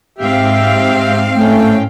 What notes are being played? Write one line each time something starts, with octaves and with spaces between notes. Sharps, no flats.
G#2 C4 G4 E5 F5 G5
A2 A3 C#4 G5